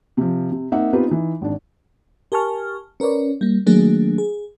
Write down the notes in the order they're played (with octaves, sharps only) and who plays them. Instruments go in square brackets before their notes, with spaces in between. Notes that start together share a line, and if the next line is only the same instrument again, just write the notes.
[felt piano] C3 F3
C3
A#3 C4 D#4 E5 F#5
B3 C4 D#4 F4 G4 B4
E3 D#4
G#1 D4
[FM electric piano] G4 A#4 G#5 A5 C#6 F6
C#4 A#4 B4 C#5 D5
G3 A#3
D#3 F#3 A3 A#3 D4 G#4
G#4